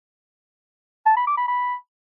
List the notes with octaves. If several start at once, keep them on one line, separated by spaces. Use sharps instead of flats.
A5
B5
D6
B5
B5